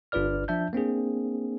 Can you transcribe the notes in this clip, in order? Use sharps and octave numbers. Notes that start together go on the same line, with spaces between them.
G1 D4 F4 B4 D5 F6
F3 D4 E5 A5 G6
A#3 C4 D4 G#4